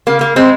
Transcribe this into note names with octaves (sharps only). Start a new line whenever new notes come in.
C#3 A#3
A#3
G#3 C4